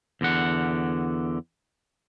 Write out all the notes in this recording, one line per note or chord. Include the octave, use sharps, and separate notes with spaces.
E2 D3 F#5